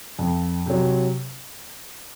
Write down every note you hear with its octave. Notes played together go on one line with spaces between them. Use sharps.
F2
C3 F#3